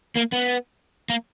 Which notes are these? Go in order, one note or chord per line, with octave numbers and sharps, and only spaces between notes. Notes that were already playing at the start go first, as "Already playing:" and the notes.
A#3
B3
A#3